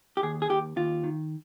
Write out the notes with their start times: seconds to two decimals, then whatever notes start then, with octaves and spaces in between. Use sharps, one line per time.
0.17 G4
0.23 D#2 G#4
0.42 G#4
0.50 D#2 G4
0.76 D#2 F4
1.04 D#3